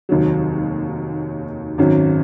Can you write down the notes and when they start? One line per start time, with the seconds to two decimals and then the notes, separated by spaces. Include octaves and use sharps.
0.09 F1 D#2 D#3 F#3
1.78 G#1 F#2 D#3 F#3